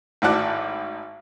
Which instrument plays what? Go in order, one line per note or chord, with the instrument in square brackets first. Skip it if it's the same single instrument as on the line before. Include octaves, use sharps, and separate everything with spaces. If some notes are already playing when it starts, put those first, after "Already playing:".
[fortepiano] G#1 A2 F#4 A4 D5 F#6